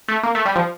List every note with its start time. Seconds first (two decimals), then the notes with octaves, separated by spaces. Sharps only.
0.08 A3
0.23 A#3
0.35 A3
0.45 G3
0.56 F3